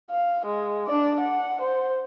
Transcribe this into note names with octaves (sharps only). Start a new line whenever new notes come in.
F5
G#3
D4 D5
F#5
C5